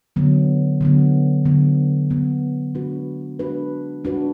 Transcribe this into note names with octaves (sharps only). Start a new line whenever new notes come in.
D3 F#3 B3
D3 F#3 B3
D3 F#3 B3
D3 F#3 B3
G#3 D4 F#4 B4
G#3 D4 F#4 B4
G#3 D4 F#4 B4